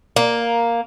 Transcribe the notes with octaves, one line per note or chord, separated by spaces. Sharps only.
A#3